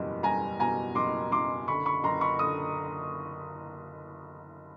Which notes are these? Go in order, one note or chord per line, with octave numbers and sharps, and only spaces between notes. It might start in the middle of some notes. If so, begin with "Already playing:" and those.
Already playing: F#1 E2 B2 G3
G3 G#5 A#5
B2 G#5 A#5
F#1 C6 D6
F#1 C6 D6
D3 B5 C#6
B5 C#6
F#1 A#5 C6
B5 C#6
D3 D#6